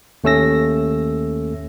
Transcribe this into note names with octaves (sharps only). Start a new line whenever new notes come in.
D#2 A3 C#4 E6 A#6